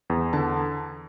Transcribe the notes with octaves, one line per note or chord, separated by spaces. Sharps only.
E2
D3 A5